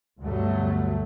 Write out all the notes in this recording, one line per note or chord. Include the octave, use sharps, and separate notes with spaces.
D2 G2 B2 F#3 A3